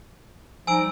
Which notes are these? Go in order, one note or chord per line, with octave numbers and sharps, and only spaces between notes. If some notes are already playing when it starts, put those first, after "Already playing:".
F3 G3 D#4 G#5 E6 D7